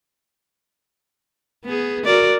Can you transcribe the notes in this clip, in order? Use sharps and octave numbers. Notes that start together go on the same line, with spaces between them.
B3 G#4
F#4 A#4 D5